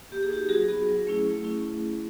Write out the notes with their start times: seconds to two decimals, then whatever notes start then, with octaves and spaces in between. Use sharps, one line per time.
0.11 A#3 G4
0.23 G#4
0.30 D#4 F#4 G4
0.49 F#3 F#4 G#4
0.69 B3 D#4 F#4
0.87 F#3
1.07 A3 C#4 E4
1.25 A3
1.44 C#4 E4